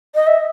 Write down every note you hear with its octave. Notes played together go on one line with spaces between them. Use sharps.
D#5
E5